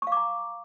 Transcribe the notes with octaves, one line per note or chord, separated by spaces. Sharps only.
F5 A#5 C#6 D6